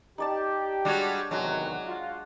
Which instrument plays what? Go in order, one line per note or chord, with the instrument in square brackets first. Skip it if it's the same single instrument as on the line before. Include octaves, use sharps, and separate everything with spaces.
[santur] D#4 D5 A5 [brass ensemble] G4
[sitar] G3 G#3 F#4 [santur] D4 C#5
[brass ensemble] E2 C3 D#3 [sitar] F#3 [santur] G#3 F#4
[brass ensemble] F4